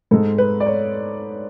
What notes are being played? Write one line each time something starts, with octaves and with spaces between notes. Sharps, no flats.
G#2 G#3 A4
B4
D5
C#5